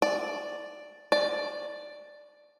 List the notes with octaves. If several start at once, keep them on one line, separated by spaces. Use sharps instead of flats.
D5
D5